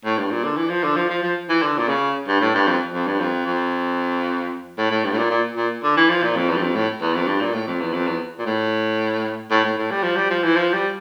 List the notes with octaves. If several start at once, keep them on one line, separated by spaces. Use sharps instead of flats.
A2
G2
A#2
D3
E3
F3
D3
F3
F3
F3
E3
D3
A#2
C#3
G2
A2
G2
F2
F2
G2
F2
F2
A2
A2
G2
A2
A#2
A#2
A#2
D3
E3
F3
A#2
F2
E2
G2
F2
A2
E2
F2
G2
A#2
A2
F2
E2
F2
E2
A#2
A2
A2
A2
A2
G3
F3
G3
F3
E3
F3
G3